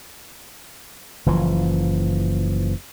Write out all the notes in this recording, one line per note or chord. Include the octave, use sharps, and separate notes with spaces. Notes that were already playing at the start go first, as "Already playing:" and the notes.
F#1 E3 F3